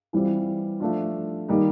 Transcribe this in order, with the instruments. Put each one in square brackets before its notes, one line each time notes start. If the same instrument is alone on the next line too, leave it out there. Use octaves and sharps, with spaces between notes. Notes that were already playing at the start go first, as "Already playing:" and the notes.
[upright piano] E3 G3 C4 F4
F3 A3 D4 F4
D#3 G3 A#3 D#4